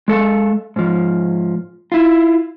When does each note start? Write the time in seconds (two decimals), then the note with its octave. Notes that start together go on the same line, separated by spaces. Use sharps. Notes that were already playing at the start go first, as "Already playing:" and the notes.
0.08 G#3 A4 F5
0.76 G#2 F3
1.92 E4 F4